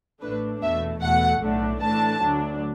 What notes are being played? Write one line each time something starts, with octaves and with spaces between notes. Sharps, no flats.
A1 A2 A3 D4 B4
E2 B2 A3 E5
E2 B2 A3 F#5
B1 A2 A3 D4
A2 E3 A3 D4 A5
D2 D3 F#3 D4